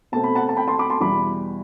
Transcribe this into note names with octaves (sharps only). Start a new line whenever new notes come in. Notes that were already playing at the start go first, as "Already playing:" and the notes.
B2 A3 C4 A5
B5
F#5 A5
A5
G5 B5
A5 C6
B5 D6
A5 C6
E2 B2 G3 B5 D6